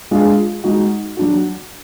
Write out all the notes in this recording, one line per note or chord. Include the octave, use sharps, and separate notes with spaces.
G#3 D4 F4 G#4
G#3 D#4 F#4
F#3 D4 F#4